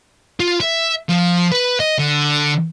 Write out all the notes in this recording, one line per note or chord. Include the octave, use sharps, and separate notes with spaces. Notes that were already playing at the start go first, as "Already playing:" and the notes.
F4
E5
F3
B4
D#5
D3